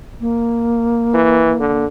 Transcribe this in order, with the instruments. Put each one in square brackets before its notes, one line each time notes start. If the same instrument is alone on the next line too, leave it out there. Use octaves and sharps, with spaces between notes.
[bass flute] A#3
[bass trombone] E3
D3